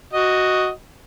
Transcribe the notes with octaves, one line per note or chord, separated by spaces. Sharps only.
F#4 D#5